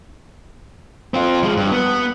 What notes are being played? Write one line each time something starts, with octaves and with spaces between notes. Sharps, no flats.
C4 F4
F3 G#3
G2
B3